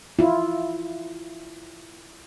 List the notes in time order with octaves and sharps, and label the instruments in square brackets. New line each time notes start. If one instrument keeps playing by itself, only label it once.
[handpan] E4 F4